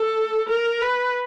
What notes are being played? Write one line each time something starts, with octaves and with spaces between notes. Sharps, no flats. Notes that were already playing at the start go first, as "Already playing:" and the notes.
Already playing: A4
A#4
B4